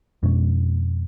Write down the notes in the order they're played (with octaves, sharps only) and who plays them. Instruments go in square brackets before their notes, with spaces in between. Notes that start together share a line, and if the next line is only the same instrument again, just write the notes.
[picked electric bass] F2 B2 G#3 C#4